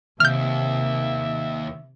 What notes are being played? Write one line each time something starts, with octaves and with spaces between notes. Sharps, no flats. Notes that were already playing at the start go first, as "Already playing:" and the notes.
D#2 C3 E5 F6 G6